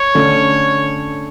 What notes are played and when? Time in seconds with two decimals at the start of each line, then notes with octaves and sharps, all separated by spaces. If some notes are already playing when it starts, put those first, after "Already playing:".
Already playing: C#5
0.15 D3 A3 C#4